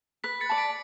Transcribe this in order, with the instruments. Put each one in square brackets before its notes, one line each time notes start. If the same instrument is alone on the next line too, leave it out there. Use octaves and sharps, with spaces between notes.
[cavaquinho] B4 [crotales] B6
[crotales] A6 C#7
[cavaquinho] D5 A5
[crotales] B6 D7